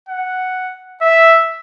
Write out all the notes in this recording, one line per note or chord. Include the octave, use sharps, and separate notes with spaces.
F#5
E5